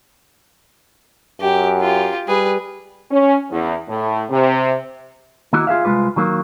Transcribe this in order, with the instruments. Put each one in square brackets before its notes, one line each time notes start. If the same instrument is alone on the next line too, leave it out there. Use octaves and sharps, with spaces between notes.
[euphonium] F#2 [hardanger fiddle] G4
[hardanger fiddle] F4 G4
[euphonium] G3 [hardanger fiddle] G#4 B4
[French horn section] C#4
E2
A2
C3
[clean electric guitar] D#3 A#3 E4 F#4
F4 G#4 A#4 E5 F5
C2 G#2 G#3 F4 B4
D#3 F#3 A#3